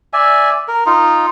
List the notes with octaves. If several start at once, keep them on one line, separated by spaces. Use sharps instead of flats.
D5 E5 G#5
A#4
D#4 F4